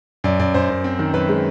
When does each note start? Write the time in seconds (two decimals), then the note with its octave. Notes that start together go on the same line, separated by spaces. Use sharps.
0.24 F#2 D5
0.39 F#2 D5
0.54 F#2 C5
0.70 F#2
0.84 C4
0.99 D#3
1.14 F#2 B4
1.29 G#3